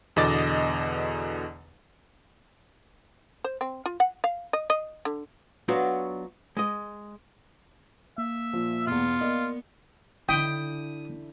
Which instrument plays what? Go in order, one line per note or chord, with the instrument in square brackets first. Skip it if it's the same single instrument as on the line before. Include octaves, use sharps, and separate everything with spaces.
[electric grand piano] E2 B2 D3 D#5 D6 A6
[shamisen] C5
C4
F4
F#5
F5
D#5
D#5
D3
[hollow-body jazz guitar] F#3 B3 D4 F4 F#4
G#3 D#5
[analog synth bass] A#3 [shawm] E5
[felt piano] A#2 F3
[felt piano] E2 B2 [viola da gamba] B3 [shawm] F4
[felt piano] A#3 D5 D#5
[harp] D3 E4 [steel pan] G5 [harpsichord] D#6